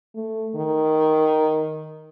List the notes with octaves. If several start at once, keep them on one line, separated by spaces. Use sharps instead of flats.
A3
D#3